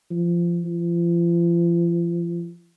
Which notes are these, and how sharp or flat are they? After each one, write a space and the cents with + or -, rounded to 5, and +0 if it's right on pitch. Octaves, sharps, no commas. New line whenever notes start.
F3 -20
F3 -40